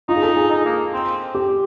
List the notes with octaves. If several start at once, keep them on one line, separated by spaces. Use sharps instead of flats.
D#4 F4
G#4
A4
G#4
D#4
A#3
C4
G4